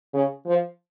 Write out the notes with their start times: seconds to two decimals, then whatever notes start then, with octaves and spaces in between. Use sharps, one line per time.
0.14 C#3
0.46 F3